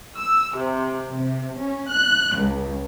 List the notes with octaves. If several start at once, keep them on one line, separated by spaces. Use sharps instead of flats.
E6
C3
C3
C#4
F#6
C#2